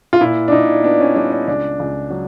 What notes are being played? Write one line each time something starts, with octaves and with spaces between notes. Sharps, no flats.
F4
A#2 E4
D4
A#2 D#4
B3 D4
C#4
G3 D4
D4
C#2 D4
C#2
F#3